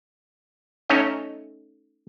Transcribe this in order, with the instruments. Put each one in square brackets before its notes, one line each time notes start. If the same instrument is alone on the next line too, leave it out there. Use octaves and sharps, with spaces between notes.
[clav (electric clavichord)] A3 C#4 D#4 C#5 D#5